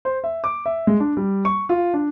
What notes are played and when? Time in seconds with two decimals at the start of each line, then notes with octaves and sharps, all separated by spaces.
0.05 C5
0.24 E5
0.44 D6
0.66 E5
0.87 G#3
1.00 D4
1.17 G3
1.45 C#6
1.69 F4
1.94 D4